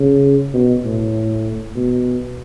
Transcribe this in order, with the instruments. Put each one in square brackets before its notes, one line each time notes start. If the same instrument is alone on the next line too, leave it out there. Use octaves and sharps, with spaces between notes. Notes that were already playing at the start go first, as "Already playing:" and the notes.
Already playing: [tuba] C#3
B2
A2
B2